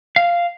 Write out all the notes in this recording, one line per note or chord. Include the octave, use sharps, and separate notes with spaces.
F5